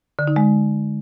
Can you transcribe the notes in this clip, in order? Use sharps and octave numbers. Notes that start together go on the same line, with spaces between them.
D3
D#4
G#3